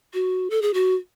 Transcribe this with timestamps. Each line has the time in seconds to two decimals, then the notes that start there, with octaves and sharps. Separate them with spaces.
0.14 F#4
0.50 A4
0.62 G#4
0.74 F#4